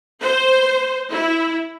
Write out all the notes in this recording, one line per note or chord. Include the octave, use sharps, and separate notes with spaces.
C5
E4